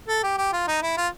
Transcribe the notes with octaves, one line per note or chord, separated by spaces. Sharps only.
A4
G4
G4
F4
D#4
E4
F4